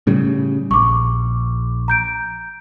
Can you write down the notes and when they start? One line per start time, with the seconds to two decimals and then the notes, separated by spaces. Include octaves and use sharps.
0.07 A2 C#3 G3
0.71 A#1 C#6 D6
1.88 A#5 G6 D7